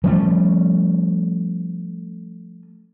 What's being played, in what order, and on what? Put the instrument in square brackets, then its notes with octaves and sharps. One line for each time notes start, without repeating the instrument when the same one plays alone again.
[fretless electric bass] F3 G3 A3 C#4